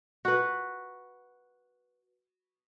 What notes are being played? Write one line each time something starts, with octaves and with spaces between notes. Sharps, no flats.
F#4 B4